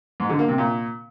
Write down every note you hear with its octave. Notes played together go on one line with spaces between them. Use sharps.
G#2
D3
A#3
C3
A#2